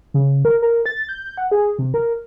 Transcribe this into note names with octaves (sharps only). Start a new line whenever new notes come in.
C#3
A#4
A#4
A6
G6
F#5
G#4
C3
A#4